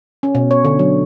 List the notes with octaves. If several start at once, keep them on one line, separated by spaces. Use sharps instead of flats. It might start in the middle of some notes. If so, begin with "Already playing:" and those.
C#4
B2
C#5
D3
F#3